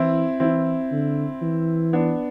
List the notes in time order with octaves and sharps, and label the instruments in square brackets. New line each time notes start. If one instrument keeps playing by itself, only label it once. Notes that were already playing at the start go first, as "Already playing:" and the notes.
Already playing: [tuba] E3 [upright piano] C4 E4
[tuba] E3 [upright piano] C4 E4
[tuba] D3
E3
[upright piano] B3 D4